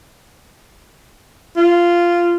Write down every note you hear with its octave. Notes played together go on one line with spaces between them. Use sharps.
F4